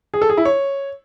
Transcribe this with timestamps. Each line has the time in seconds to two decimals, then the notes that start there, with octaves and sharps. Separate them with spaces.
0.14 G#4
0.22 A4
0.29 G#4
0.37 E4
0.45 C#5